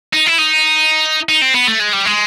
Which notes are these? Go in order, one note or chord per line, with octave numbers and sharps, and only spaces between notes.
D#4
E4
D#4
D#4
C4
B3
A3
G#3
G3
G#3